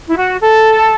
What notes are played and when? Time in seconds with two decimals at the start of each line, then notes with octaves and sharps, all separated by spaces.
0.08 E4
0.16 F#4
0.41 A4